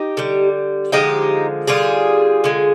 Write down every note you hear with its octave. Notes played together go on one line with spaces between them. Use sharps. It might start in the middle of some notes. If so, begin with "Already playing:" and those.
Already playing: D#4 G4
D3 G3
D3 F3 G#3 D#4 G4
D3 G3 F4 G#4
D3 G#3